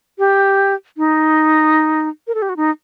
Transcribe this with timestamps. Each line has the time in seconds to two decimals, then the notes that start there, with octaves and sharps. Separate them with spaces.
0.19 G4
0.98 D#4
2.27 A#4
2.35 A4
2.42 G4
2.49 F#4
2.57 D#4